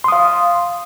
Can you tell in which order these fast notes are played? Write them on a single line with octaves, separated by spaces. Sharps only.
C6 D#6 F5